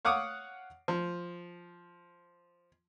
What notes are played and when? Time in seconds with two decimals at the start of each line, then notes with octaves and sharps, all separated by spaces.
0.05 C#5 F5 F#5 D6 D#6
0.88 F3